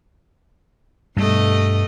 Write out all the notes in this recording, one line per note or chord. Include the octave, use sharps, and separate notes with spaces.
G2 B2 G3 A3 D#5